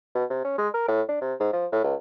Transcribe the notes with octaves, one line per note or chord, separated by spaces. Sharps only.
B2
C3
C#4
G#3
A#4
A2
D4
C3
G#2
F3
A2
C#2